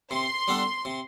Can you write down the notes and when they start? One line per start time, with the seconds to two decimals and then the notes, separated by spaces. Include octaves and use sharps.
0.10 C3 C6
0.48 G3 B3 D4 A4
0.85 C3